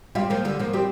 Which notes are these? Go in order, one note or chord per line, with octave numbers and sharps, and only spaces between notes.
G3 C4 F4
F3 A#3
D3 G3
F3 A#3
G3 C4 G4